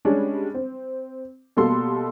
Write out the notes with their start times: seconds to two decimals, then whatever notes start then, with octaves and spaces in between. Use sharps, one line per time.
0.05 G3 G#3 C#4 D4
0.54 C4
1.57 B2 G3 A#3 A4 C6